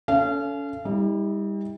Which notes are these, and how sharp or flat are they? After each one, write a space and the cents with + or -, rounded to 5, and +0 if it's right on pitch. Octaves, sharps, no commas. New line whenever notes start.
C#4 +35 A4 +0 F5 -30
G3 +30 E4 -45